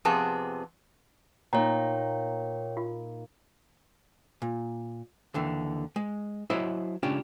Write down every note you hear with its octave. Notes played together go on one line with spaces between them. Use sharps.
F2 C3 B3 G#4 A5
A#2 D#4 C#5 G5 A#5
F4
A#2
D#2 D3 E3
G#3
F#3 E4 C5 C#5 D#5
C#3 G#3 C#4 D4 F4 G4